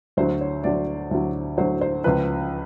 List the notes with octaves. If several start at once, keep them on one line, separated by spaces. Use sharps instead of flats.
D2 D3 F#3 C5
C#5
D2 D3 F#3 D5
D2 D3 F#3
D2 D3 F#3 C5
C5
C#2 C#3 F3 B4